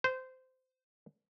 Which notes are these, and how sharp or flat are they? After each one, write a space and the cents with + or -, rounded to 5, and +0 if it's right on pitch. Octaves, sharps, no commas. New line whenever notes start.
C5 -20